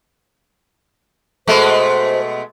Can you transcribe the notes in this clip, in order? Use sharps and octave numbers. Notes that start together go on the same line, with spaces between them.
B2 G#3 A3 C5